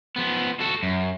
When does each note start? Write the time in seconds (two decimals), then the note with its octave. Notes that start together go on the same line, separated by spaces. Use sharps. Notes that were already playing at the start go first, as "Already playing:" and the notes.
0.16 F3 B3
0.60 F#4 A4
0.83 F#2